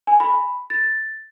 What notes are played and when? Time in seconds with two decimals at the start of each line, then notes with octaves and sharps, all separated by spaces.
0.07 G#5
0.20 B5
0.70 A6